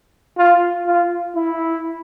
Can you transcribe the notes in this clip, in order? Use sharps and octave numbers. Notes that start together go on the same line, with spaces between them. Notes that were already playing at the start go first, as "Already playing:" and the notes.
F4
F4
E4